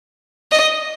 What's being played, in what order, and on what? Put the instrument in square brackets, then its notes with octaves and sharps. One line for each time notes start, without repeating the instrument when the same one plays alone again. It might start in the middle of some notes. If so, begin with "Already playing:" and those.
[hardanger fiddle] D#5